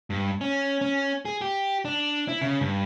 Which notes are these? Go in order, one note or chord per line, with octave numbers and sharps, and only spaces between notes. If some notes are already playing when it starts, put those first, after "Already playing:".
G2
C#4
C#4
G#4
G4
D4
E4
C#3
G2